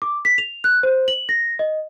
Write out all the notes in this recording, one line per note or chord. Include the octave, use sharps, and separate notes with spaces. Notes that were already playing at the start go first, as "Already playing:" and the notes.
D6
B6
F7
F#6
C5
F#7
A#6
D#5